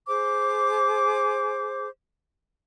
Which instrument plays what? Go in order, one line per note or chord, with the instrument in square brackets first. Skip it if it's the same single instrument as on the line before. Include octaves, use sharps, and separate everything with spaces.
[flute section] G#4 C5 D6